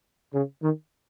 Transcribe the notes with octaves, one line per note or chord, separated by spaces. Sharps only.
C#3
D#3